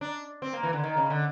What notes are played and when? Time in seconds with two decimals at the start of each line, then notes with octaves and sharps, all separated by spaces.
0.01 D4
0.42 C4
0.53 A#3
0.63 E3
0.73 D3
0.83 D#3
0.97 C#3
1.10 D3